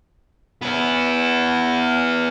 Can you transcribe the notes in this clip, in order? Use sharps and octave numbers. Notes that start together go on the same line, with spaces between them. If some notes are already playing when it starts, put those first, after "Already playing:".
B3 E4